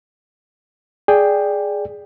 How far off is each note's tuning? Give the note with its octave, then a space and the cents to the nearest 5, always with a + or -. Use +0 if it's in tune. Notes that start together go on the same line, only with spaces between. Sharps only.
G#4 +0 D5 +0 G5 +10